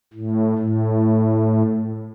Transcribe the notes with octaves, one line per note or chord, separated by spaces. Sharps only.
A2
A2